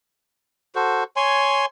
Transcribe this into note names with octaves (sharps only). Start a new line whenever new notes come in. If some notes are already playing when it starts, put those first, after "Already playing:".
F#4 A4 C5
C#5 G#5 C6